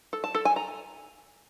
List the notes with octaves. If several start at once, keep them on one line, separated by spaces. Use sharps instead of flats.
A4
A5
A4
G#5
A#5